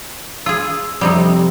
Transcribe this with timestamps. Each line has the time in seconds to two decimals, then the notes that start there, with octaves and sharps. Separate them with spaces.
0.46 F4 G#4 E6
1.01 F2 C3 G3 C4 D#4